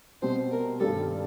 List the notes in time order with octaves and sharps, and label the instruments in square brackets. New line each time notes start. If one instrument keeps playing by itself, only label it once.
[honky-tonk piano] B2 G3 C4 [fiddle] C5
[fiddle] A#4
[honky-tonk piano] G2 D#3 G3 [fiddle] A4